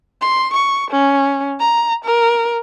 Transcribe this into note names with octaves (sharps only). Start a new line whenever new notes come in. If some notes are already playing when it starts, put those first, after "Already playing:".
C6
C#6
C#4
A#5
A#4